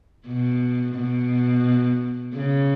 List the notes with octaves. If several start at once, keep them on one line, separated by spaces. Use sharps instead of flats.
B2
B2
C#3